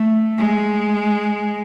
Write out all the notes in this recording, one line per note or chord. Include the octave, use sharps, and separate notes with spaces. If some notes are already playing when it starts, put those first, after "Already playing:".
Already playing: A3
G#3